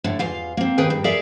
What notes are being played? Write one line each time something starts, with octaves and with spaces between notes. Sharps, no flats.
A2 D3
E2 F4 F5
A#3 C4
D#2 D#3 G#4 B4 G5
G2
G#4 A#4 D5 E5 F5